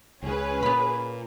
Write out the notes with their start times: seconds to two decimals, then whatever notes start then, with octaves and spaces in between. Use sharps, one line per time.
0.22 C#2 C#3 C#4 G#4 B4
0.63 A#2 B3 B5